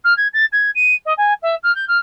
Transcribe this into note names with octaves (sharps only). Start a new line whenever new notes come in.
F6
G#6
A6
G#6
D#7
D#5
G#5
E5
F6
G6
F6